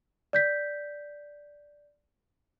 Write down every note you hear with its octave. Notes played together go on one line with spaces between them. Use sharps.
D5 G6 B6